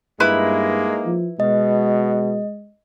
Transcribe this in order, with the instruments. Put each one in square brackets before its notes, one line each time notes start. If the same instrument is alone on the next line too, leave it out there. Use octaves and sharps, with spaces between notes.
[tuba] G2 [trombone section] G#3 A#3 D#4 [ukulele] E4 B4 B5
[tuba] F3
[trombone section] B2 [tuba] G#3 [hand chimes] D#5